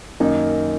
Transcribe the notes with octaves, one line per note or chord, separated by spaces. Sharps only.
F#2 D#3 A#3 D#4